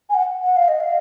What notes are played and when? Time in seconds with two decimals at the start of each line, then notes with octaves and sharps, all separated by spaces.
0.09 G#5
0.14 F#5
0.44 F#5
0.56 F5
0.68 D#5
0.80 F5